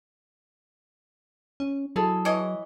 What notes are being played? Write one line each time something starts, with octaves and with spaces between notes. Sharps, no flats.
C#4
F#3 E4 G#4 A4
E3 C#5 D#5